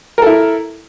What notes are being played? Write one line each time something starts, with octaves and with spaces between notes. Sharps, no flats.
E4 A4 A#4